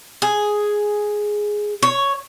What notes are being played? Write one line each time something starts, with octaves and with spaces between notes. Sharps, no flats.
G#4
C#5